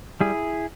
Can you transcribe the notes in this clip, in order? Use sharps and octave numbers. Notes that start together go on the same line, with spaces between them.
G3 E4 G#4